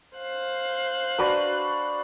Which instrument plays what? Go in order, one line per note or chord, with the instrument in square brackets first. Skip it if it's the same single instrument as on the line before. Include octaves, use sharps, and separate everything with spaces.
[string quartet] C5 F5 F#6
[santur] D4 F#4 B4